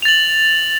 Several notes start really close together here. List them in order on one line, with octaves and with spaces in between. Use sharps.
F7 A6 F#7